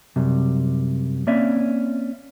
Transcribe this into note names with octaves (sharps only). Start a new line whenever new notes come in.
F#2 C3 F#3 G3
A#3 C4 C#4 D5 E5